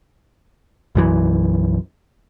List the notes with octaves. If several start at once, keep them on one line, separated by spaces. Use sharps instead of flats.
B1 F#2 E3